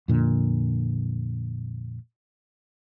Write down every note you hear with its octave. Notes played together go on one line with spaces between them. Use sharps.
F2 A#2 D3